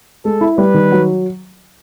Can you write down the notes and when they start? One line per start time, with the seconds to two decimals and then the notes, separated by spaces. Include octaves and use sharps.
0.25 G#3 A4
0.41 E4
0.58 G3 B4
0.74 D#3
0.92 F#3